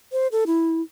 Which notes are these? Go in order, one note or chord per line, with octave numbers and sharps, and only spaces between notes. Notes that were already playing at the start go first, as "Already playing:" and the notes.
C5
A4
E4